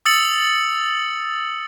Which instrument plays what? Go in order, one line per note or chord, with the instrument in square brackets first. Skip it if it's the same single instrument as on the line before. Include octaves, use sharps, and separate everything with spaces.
[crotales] D#6 E6 A6 C#7 F#7